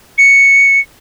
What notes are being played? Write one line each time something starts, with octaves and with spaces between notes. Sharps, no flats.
C#7